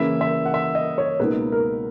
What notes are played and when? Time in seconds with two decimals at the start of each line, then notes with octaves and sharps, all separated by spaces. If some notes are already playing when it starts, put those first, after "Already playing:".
Already playing: C#3 E3 A#3 E4 E5
0.21 E5
0.45 F#5
0.54 E5
0.75 D#5
0.98 C#5
1.19 C#2 B2 A#3 D#4 B4
1.52 A#4